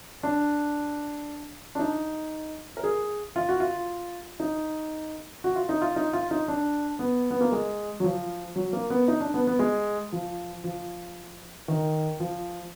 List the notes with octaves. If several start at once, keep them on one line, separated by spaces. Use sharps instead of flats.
D4
D4
D#4
A#4
G#4
F4
F#4
F4
D#4
F#4
F4
D#4
F4
D#4
F4
D#4
D4
B3
B3
A#3
G#3
F#3
F3
F#3
A#3
B3
D#4
D4
B3
B3
G#3
F3
F3
D#3
F3